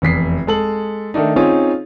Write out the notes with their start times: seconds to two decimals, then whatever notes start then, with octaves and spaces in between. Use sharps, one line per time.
0.02 F1 E2 B6 C7
0.47 G#3 A4 F#7
1.14 D#3 A3 D4 D#4
1.36 C4 C#4 D#4 F4 G#4